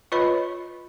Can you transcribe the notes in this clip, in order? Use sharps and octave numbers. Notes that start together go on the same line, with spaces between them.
F4 B4 C#5 D#5 B5